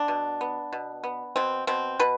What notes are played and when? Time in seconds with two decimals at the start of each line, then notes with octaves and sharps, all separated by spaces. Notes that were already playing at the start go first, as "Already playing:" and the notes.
Already playing: B3 D4
0.08 B2
0.41 B3
0.73 B2
1.04 B3
1.36 B2 C4
1.67 B2 C4
1.99 B2 B4